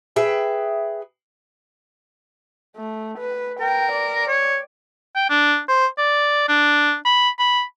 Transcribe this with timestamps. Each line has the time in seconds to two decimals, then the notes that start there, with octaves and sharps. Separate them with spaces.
0.16 G#4 B4 E5 G5
2.76 A3
3.19 B4
3.60 A#4 G5
3.92 D5
4.28 C#5
5.16 G5
5.30 D4
5.68 C5
5.98 D5
6.48 D4
7.06 B5
7.39 B5